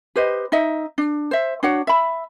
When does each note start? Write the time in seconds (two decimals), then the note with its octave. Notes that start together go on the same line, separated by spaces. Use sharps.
0.16 G4 B4 C5 D#5
0.52 D#4 D#5 E5
0.98 D4
1.31 C5 E5
1.63 D4 F#4 C#5 F#5
1.87 E5 B5